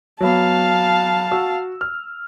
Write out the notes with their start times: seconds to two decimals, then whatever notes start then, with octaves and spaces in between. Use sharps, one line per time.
0.21 F#3 B3 F5 A5
1.31 F#4 E6
1.81 F6